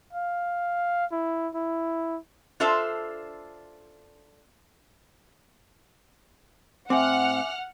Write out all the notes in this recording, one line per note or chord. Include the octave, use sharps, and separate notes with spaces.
F5
E4
E4
D4 F4 A4 C5 E5
A2 C4 E5 F#5 G#5 D6 F6